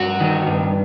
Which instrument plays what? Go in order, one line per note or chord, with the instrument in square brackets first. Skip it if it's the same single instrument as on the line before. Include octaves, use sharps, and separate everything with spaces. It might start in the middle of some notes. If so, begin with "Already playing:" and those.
Already playing: [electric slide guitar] G2 F#4
D#3
G2